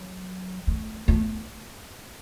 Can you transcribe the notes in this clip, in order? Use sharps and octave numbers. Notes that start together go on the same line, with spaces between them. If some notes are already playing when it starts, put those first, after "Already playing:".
Already playing: F#3
A3
A3